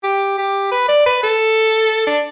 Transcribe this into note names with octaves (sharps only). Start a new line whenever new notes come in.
G4
G4
B4
D5
B4
A4
D4